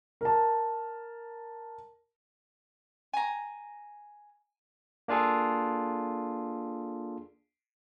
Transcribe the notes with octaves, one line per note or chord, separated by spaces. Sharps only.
A#4 A5
G#5 A#5
A#3 D4 F4 G#4 A4